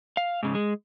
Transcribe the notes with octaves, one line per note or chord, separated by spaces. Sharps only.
F5
G#2 C#3
G#3